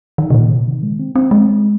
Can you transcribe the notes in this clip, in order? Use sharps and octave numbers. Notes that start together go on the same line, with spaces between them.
D#3
C3
A#2
C3
D#3
G#3
C4
C4
G#3